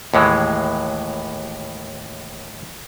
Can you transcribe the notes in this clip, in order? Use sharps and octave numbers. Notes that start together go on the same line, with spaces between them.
D#2 A2 E3 G#3